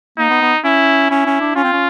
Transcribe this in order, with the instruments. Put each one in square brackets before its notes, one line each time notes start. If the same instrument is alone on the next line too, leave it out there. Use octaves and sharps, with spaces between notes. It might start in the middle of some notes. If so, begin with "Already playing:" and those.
[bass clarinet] A#3 [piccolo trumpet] D#4
[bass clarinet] B3
B3
[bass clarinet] C#4 [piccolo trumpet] E4
[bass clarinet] C#4 [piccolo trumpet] E4
[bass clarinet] C#4
D4
[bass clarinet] C#4 [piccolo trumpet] F4
[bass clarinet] C4
C#4